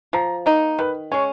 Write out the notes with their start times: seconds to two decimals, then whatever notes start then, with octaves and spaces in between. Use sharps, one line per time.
0.13 F3 A#5
0.46 A#3 D#4
0.79 D#3 B4
1.12 G#3 C#4 C#5